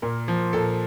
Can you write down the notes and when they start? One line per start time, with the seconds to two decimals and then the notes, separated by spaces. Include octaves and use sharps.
0.02 A#2 A#4
0.28 F3
0.53 A#2 A4